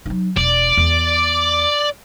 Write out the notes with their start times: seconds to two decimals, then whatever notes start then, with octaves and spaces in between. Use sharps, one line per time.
0.06 F#3 D#4
0.37 E1 D5
0.77 E2